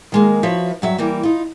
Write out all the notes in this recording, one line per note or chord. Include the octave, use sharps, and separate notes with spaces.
D#3 G#3 A#3
F3 F#4 B4 C#5 E5
G2 F#3 E5
E3 G3 A#3
D#4 F4